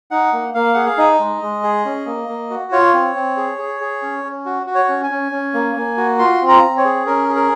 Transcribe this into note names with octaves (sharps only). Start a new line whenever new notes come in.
D#4 F#5
A#3
A#3 F5
G#4 F#5
F5
D#4 D#5
G#3
G#3
G#4
C#4
A#3
A#3
F#4
F4 C#5
C4
C4
G#4
G#4
G#4
C#4
C#4
F#4
F#4
C#5
C#4
G#5
C#4
C#4
A#3
A#3
F#4
F4 C6
C4
A#5
C4
C#5
G#4
C#4 A#4
G#4
A#4